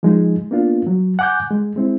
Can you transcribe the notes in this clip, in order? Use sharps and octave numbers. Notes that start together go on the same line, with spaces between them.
F3 G#3 D#4 G#4
A#3 B3 D4 F4
F#3
F#5 G#5 D6 F#6 G6
G#3
G#3 C4 E4